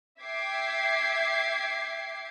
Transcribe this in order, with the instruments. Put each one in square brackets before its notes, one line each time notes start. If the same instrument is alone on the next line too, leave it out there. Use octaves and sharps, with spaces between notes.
[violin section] E5 G5 D6 G#6 C7